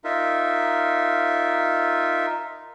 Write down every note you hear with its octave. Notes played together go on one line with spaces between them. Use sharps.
D#4 F4 A#4 E5